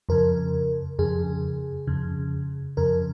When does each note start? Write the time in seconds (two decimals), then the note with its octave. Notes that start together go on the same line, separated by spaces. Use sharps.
0.09 F2 C#3 A#4
0.99 F2 C#3 G#4
1.87 F2 C#3
2.77 F2 C#3 A#4